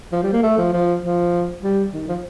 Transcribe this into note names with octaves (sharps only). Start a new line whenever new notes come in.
F3
G3
A#3
A3
F3
F3
F3
G3
D#3
F3